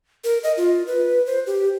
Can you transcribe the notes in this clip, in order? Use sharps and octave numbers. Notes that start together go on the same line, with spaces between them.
A#4
D#5
F4
B4
C5
G4